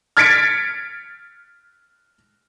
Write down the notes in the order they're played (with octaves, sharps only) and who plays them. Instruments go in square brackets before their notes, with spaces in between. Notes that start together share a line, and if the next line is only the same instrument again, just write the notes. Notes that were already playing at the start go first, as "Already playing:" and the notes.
[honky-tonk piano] F6 G#6 A6 B6 C#7 D7